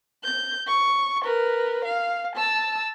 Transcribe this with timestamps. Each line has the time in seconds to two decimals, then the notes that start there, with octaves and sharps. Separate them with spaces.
0.24 G6
0.67 C#6
1.24 A#4 B4
1.85 F5
2.36 A5 E6